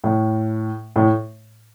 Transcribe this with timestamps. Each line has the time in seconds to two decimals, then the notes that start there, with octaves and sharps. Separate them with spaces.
0.04 A2
0.96 A2